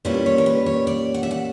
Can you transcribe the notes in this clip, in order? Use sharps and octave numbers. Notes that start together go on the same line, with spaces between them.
A#2 G3 A#3 C#4 E4 B4
C#5
A#4
B4
C#5
D5
F#5
E5
F#5